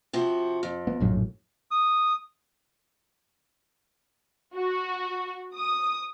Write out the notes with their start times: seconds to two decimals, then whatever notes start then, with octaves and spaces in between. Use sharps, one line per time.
0.13 C3 F3 F#4
0.63 F2
0.87 B3
1.00 A#1 F#2 A2
1.71 D#6
4.54 F#4
5.56 D#6